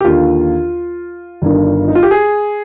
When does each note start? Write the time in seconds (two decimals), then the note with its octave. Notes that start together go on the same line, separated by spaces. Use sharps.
0.01 G4
0.04 D#2 D3 F4
1.42 G1 G2 D#3
1.88 D#4
1.95 F4
2.03 G4
2.11 G#4